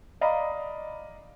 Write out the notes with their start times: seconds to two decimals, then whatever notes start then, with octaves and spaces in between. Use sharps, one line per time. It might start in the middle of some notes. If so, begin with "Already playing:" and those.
0.21 D5 D#5 F5 A#5 B5